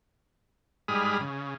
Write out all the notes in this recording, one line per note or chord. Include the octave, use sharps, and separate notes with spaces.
G#2 G3 G#4 B5 D#6 F6
C#3